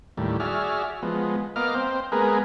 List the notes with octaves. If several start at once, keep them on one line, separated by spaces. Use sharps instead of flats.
D#2 A2 G3
F#4 G#4 D5 E5 F6
F3 G#3 B3
A#3 B3 D#5 F5 D6 F6
C4 C5
G#3 A#3 B3 G#4 A#4 B4